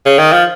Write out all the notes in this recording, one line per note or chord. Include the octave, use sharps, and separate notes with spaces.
C#3
D#3
F3